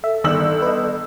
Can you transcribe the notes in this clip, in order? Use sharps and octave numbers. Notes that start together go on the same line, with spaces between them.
A4 E5
G1 D#3 E6 F#7
B4 D#5